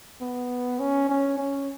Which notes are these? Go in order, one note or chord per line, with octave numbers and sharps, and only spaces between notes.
B3
C#4
C#4
C#4